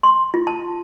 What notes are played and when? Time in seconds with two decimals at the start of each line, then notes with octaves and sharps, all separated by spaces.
0.03 C6
0.34 F4
0.47 A5